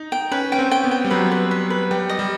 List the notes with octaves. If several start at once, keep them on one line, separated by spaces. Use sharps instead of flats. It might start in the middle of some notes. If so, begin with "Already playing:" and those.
Already playing: D#4
G5
C#4 B4
C#4 G5
C4
G5
B3
G5
G3
F#3 B4
B4
B4
B4
G3 G5
D#5
G3